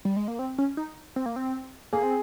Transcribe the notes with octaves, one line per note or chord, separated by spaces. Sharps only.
G3
G#3
A#3
C4
C#4
D#4
C4
A#3
C4
A#3 G#4
C4